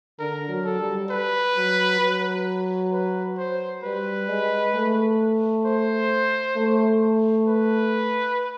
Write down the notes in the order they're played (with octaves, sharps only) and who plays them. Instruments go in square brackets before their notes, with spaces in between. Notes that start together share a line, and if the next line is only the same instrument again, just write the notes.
[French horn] D3 [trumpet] A#4
[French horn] F#3
[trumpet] A4
[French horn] G3
[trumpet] B4
[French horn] F#3
F#3
[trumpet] B4
C5
[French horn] G3 [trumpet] B4
[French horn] G#3
A3
[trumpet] C5
[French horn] A3
[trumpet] B4